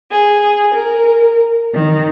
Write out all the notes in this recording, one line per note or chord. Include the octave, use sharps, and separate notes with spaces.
G#4
A#4
D#3